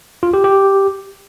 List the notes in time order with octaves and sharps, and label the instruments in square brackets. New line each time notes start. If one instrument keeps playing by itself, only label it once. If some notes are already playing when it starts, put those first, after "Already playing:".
[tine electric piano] F4
G4
G4